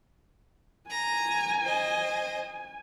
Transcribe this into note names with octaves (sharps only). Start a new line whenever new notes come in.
G#5 A#5
C5 D#5